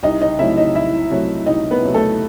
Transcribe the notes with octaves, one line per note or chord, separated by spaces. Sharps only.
C2 D#4 D#5
D#4 D#5
C3 F#3 A3 E4 E5
D#4 D#5
C2 E4 E5
C3 F#3 A3
C2 D#4 D#5
B3 B4
C3 F#3 A3
A3 A4